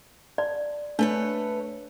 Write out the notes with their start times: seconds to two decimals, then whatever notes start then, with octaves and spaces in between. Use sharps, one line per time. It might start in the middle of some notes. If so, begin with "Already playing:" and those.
0.38 D5
0.99 A3 D4 B4 C#5